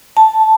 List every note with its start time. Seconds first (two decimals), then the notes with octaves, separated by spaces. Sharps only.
0.17 A5